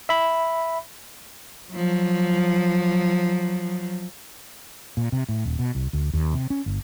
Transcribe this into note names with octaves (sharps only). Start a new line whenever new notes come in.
E5 B5
F3 F#3
A#2
C3
A2
D#1
B2
C2
D2
D#2
C3
C#4
G1